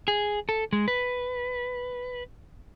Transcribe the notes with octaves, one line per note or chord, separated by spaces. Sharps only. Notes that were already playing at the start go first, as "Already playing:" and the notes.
G#4
A4
G#3
B4